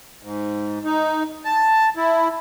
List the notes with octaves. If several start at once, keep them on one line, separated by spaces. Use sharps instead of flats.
G#2
D#4
A5
E4